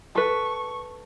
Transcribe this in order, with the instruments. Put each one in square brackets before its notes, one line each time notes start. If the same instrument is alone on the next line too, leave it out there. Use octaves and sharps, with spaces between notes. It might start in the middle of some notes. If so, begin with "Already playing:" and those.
[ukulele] A4 B4 [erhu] C#6